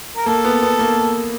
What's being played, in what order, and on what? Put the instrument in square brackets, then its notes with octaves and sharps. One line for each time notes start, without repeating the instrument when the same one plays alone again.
[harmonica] A#4
[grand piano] A#3 [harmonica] A4
[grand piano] B3
B3
A#3